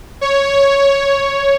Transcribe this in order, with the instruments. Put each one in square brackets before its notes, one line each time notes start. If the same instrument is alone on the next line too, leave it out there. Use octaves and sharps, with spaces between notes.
[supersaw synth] C#5